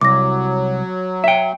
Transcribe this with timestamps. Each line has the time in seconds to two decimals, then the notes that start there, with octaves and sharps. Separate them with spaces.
0.01 C2 F#3 D6 A#6
1.24 E5 G5